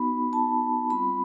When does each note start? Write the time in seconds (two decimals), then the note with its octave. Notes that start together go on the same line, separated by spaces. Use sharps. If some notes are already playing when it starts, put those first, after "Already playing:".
Already playing: B3 D#4 F#4 B5
0.33 A5
0.90 G3 C4 F4 B5